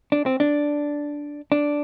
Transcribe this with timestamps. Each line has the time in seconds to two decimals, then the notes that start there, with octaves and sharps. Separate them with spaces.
0.12 D4
0.26 C4
0.40 D4
1.52 D4